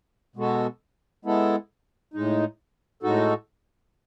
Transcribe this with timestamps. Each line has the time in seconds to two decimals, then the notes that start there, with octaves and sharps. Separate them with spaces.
0.36 B2 G#3 B3 F#4 A4
1.25 G#3 B3 E4 A4
2.14 A2 G#3 D#4
3.03 A2 G#3 D#4 F#4 A4